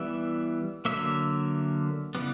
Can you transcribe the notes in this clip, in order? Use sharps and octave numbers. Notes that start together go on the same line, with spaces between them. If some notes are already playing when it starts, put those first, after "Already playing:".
Already playing: E3 G3 B3 E5
D3 F#3 A#3 E5
C#3 E3 G3 B3